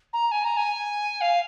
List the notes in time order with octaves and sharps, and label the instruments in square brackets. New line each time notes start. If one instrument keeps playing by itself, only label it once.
[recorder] A#5
G#5
A#5
G#5
F5